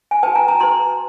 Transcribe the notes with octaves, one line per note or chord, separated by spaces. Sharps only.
G#5
F#4 B4 G5 A5
G#5 A#5
G#5 A#5
F#4 B4 A#5 C6